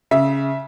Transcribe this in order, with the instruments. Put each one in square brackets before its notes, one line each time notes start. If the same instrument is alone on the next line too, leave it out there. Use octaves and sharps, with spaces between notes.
[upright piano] C#3 E5